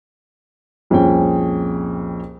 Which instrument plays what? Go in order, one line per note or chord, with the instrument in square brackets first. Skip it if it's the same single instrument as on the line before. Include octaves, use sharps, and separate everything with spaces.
[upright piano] C2 F2 A#2 C#4 G#4 G5